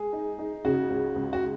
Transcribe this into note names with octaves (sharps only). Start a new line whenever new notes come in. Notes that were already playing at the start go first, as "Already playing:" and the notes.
Already playing: G#3 G#4
D#4
D#4
C#3 F#4
C#2
C#2
F#4